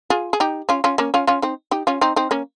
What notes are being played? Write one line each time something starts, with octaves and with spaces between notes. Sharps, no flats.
F4 G#4
G#4
D#4 G4
C#4 F4
C#4 F4
A#3 C#4
C#4 F4
C#4 F4
C4 D#4
D#4 G4
C#4 F4
C4 D#4
C4 D#4
A#3 C#4